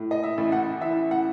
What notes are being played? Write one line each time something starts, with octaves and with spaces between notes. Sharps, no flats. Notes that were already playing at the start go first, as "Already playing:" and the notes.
Already playing: A2
D#5
E5
A1
F#5
E3 E5
F#5